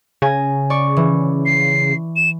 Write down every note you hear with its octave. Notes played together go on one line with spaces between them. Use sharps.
C#3 G#5 A#6
D5 C#6
E3
C7
E7